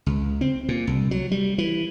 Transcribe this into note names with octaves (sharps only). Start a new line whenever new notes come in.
C#2
C4
A#2
C2
F#3
G3
E3